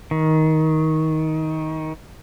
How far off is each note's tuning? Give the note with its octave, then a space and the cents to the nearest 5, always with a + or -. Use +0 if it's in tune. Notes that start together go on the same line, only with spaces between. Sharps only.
D#3 +20